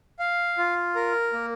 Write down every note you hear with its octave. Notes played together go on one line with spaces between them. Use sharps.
F5
F4
A#4
A#3